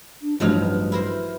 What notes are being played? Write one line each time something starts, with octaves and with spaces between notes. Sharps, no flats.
D4
A1 G2 F3 F#3 D#4 B4 F6
E4 A#4 C5